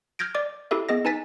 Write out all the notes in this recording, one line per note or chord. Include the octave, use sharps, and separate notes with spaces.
F6 G6 G#6 A#6 D7
D5 D6
E4 G4 A4 E5
B3 G#4 D#5 A#6
D#4 B4 G#5 A6 B6